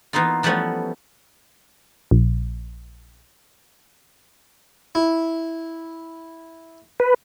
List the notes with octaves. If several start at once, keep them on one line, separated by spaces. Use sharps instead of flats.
E3 A#3 B3 D#4 F4
E3 F3 G3 A3 B3 C#4
A#1
E4
B4